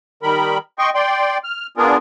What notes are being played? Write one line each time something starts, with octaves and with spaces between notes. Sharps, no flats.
D#3 G3 A#4 B5
D#5 G5 C6 C#6
D5 G5 C6
F6
B3 D4 F4 G#4 A#4